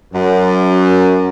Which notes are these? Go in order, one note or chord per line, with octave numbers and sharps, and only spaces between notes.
F#2